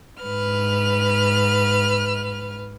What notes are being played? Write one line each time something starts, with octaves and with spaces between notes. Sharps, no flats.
G#2 B4 F6